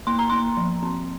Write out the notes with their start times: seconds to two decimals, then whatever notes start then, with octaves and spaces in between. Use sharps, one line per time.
0.07 A#3 C6
0.19 A#5
0.30 A#3 C6
0.57 F3
0.83 C4